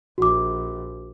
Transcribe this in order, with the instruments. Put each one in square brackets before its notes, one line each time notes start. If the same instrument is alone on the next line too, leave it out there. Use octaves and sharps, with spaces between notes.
[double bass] A#1 [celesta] F#4 D6